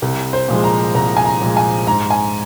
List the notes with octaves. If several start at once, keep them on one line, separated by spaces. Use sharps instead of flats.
C2
C5
A#2 F3 G#3
A#5
C2 A#5
G#5
A#5
A#2 F3 G#3
G#5
G#2 A#5
G#5